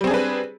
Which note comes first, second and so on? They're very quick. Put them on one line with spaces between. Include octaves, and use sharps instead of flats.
G3 C4 G#4 D4 B4